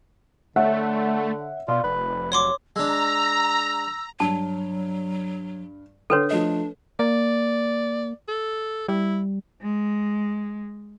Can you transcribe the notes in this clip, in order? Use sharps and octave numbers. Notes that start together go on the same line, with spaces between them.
D3 A3 C#5 E5 F#5
B2 F4 D5
F1 B4
F#3 C#5 C6 D6
G#3 D4 A#5 E6
G2 F#3 A5
D3 A4 B4 C#5 G5 C6
F3 A3 D4 D#5
A#3 D5
A4
G3 E4
G#3